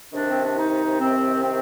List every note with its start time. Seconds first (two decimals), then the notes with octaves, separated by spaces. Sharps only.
0.12 C2 C3 D#3 D4
0.30 C4
0.43 D4
0.56 D#4
1.00 C4
1.43 C4